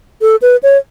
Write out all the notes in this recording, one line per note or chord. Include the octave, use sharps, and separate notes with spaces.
A4
B4
C#5